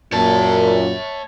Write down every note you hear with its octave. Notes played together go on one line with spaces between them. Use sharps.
F#2 A#2 C#5 A5